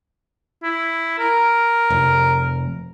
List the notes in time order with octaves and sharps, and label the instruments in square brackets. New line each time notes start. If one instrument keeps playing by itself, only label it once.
[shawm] E4
A#4
[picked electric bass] F1